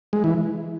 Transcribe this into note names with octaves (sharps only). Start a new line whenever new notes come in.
G#3
E3